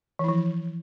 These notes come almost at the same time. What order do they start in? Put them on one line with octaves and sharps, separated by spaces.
E3 E4 F3